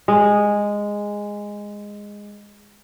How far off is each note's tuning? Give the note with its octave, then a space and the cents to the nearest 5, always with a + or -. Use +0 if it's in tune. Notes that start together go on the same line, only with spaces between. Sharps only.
G#3 -10